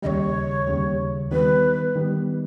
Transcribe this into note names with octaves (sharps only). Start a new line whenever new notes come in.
D#2 C#3 G3 C#5 D#5
D#2 C#3 G3
D#3 G3 B3 B4
D#3 G3 B3